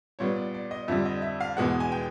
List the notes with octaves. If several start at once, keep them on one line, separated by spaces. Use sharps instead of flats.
A#2 G3 B3 C#5
D5
D5
D#5
F2 D3 G3 E5
D#5
E5
F5
E2 B2 G#3 B3 F#5
G#5
G5